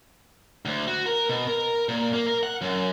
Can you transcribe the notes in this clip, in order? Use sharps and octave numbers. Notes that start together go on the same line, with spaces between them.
D2
F#4
A#4
B2
A#4
A#2
A#3
A#4
F#5
F#2